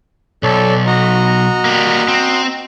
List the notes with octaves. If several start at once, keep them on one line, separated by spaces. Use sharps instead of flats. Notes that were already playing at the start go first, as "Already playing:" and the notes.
B1 A4 C#5 D5
F#4 D#5 A#5
G3 A#3
C4